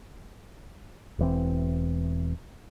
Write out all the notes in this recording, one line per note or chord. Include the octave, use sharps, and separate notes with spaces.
E1 E3 C4